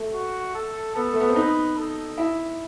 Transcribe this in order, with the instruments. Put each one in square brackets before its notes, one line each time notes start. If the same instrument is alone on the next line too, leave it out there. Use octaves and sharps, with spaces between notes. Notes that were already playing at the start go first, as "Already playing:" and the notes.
Already playing: [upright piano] A3
[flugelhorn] F#4
A4
[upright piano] B3 [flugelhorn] A4
[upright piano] A3
B3
C4
[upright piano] D#4 [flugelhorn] B4
[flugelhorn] A4
[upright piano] E4